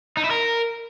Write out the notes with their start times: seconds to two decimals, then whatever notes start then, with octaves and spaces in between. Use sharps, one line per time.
0.17 D#4
0.24 E4
0.31 A#4